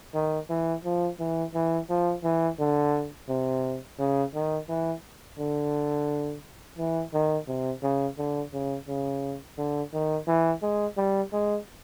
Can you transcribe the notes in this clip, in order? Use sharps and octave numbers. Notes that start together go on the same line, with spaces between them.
D#3
E3
F3
E3
E3
F3
E3
D3
C3
C#3
D#3
E3
D3
E3
D#3
C3
C#3
D3
C#3
C#3
D3
D#3
E3
G#3
G3
G#3